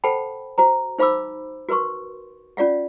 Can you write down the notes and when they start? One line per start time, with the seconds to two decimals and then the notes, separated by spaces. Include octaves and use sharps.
0.04 A4 C5 F#5 G5 A5 B5
0.58 F#4 C5 A#5
0.98 D#4 C5 F5 B5 D6 E6
1.69 F#4 A#4 B4 C6 C#6
2.57 C#4 F4 D5 F5 F#5